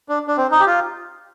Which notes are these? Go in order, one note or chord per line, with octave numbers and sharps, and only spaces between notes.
D4
D4
C4
D#4
G4
F4